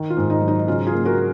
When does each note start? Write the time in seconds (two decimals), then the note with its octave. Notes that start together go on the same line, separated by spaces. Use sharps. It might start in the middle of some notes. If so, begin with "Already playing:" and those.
Already playing: D#3
0.10 F4
0.17 G#2
0.30 D#4
0.42 F#3
0.48 D#4
0.68 C#3 F4
0.87 F4 G#4
0.93 A#3
1.05 F#4 A#4